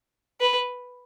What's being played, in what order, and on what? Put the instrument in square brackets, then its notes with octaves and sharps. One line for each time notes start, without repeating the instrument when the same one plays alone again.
[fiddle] B4